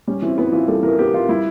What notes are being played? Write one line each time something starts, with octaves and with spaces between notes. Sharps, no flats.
G3 C#4
E3 C4
B3 E4
E3 F4
G3 A4
E3 A#4
B3 G4
E3 F4
G3 E4